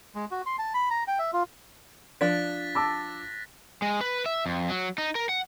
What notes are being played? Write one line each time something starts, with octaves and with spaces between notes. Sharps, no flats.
G#3
F#4
C6
A5
B5
A#5
G5
E5
F4
F3 D4 F#6 A6 B6
A5 D6 E6 A#6
G#3
B4
E5
F2
F#3
D#4
A#4
F#5